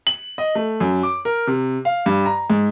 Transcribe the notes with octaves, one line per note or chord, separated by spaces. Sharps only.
F#7
D#5
A3
F#2
D6
A#4
C3
F5
G2
A#5
G#2